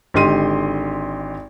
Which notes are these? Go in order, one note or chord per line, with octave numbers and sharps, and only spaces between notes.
G#1 D3 G4 D#5 C6 D#7